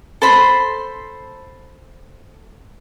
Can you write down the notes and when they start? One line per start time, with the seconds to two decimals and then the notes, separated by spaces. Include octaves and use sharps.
0.22 A4 C5 B5 C6